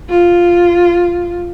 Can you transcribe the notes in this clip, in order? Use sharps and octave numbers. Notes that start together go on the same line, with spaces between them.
F4